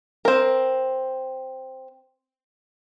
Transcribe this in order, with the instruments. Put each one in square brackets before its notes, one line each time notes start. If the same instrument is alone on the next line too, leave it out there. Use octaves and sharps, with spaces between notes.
[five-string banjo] C4 A#4